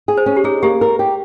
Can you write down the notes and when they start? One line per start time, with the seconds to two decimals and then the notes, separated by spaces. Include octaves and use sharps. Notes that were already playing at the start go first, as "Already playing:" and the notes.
0.08 G#4
0.17 C5
0.26 C#4
0.36 G4
0.44 D#4 G#4
0.63 A#3 G4
0.81 A#4
0.99 G4